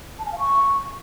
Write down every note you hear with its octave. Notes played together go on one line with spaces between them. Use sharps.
A5
G#5
F5
C#6